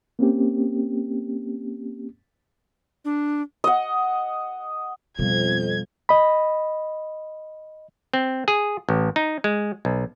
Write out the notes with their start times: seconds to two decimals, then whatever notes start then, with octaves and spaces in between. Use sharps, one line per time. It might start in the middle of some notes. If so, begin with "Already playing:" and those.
0.19 A#3 C4 C#4 G4
3.05 D4
3.64 D#5 F#5
5.19 F2 B2 G3 G#6
6.09 D#5 B5
8.14 C4
8.48 G#4
8.89 A1
9.16 D#4
9.44 G#3
9.85 B1